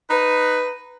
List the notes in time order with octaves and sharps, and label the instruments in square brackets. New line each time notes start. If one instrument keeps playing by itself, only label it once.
[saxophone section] D#4 B4